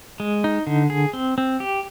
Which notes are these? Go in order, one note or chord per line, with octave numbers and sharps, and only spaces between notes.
G#3
D#4
D3
G#4
C4
C4
G4